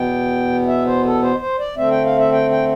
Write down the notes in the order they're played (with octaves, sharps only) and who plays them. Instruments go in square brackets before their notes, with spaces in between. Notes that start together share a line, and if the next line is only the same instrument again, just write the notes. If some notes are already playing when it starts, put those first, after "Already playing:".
Already playing: [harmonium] E2 B2 B3 G5
E5
C5
A4
C5
C5
D5
D3 A3 C4 E5
G5
F5
E5
G5
G5